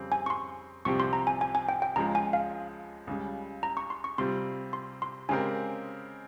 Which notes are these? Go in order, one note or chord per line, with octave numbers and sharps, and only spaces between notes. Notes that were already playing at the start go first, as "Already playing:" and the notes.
Already playing: F2 C#3 G3 C4
G#5
C#6
C6
C2 C3 F3 C4 G4 C#6
C6
A#5
G#5
G#5
G#5
G5
G5
C#2 C#3 F3 G#3 A#5
G#5
F5
C#2 C#3 G3
A#5
C#6
C6
C#6
C3 G3 C4 F4 C6
C6
C6
C#3 G#3 C4 G4 A#4 G#5